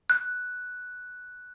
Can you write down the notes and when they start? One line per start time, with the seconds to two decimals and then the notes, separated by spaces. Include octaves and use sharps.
0.10 F#6